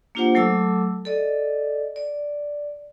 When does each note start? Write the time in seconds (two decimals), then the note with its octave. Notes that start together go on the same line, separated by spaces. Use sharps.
0.15 A#3 D4 F4 G4 C5 F#5
0.35 F#3 A3 A4 A5 D6 E6
1.05 A4 D5 D#5
1.96 D5